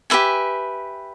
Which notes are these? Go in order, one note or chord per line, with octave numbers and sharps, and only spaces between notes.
G4 B4 E5 G#5